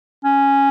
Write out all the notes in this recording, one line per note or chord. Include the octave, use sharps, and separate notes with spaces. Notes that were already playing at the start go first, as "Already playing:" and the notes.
C#4